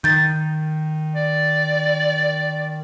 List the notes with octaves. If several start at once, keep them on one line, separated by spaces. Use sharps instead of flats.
D#3 G6 A6
D5